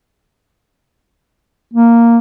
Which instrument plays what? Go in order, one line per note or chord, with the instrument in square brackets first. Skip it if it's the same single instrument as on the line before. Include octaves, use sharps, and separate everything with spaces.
[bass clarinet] A#3